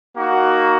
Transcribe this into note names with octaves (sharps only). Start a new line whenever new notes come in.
A#3 D#4 F#4